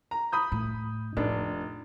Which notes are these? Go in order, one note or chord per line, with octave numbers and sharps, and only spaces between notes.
A#5
B5 D#6 G6
A2
F1 D4 D#4